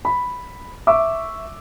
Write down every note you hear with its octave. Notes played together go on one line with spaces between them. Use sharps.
B5
E5 C#6 D6 E6